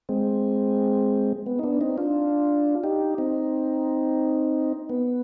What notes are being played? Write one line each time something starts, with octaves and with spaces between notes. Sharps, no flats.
G#3 C4
B3
D#4
B3 D4
C4 D#4
D4 F4
D#4 G4
C4 D#4
B3